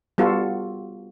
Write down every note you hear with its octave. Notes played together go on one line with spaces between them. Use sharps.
G3 B3 F4 F#4 A4